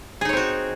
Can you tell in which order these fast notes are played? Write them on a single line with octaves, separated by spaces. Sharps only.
G#4 D#4 C#5 C4 F#4